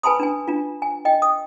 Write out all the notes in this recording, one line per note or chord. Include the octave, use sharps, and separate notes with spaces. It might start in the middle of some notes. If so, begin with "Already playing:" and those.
B4 G#5 A5 B5 C6 D#6
D4 G#5
D4 F4
G#5
D#5 G5
D#6